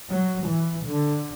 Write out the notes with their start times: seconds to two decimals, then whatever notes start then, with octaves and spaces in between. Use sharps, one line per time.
0.11 F#3
0.48 E3
0.85 D3